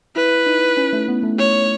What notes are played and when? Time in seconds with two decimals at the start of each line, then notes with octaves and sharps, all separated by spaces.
0.16 E4 B4
0.46 D#4
0.77 C#4
0.93 A3
1.08 B3
1.23 A3
1.38 C#5